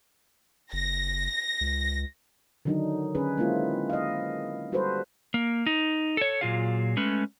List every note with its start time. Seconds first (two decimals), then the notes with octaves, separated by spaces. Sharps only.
0.73 F#1 A#6
1.61 C#2
2.65 D3 D#3 F#3 D4 D#4
3.15 D3 C#4 G#4 B4
3.37 G#3 A#3 C4 E4 F4
3.90 D#5 F5
4.72 G3 F#4 A4 B4 C5
5.34 A#3
5.66 D#4
6.17 A4 C#5
6.41 A#2 F#3 F4 G#4 F5
6.97 G#3 A3 C#4 B4